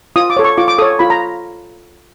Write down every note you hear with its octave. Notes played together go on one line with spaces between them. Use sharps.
F4 D#6
D6
A4 C#5
C#6
F4 D6
D6
A4 C#5 D#6
F4 B5
A#5